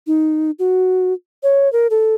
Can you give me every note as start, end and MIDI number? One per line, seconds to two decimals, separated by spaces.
0.07 0.51 63
0.59 1.13 66
1.43 1.71 73
1.73 1.87 70
1.90 2.15 69